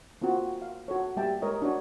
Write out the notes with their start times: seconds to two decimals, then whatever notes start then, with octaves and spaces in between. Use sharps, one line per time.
0.22 A#3 C4 F4 F#4
0.62 F5
0.88 F#4 A4 C#5
1.17 G3 A#3 G4 E5 G5 A5
1.42 G#3 A#4 C#5 D#5
1.62 D4 F#4 C#5